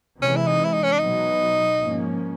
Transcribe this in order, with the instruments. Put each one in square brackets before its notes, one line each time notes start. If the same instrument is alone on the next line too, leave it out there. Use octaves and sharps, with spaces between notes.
[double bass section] C3 E3 G#3 [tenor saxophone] C#4
[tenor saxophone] E4
D#4
E4
D#4
C#4
D4
[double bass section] B2 F#3 B3 [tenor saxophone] D#4
[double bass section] G#2 F3 A#3 C#4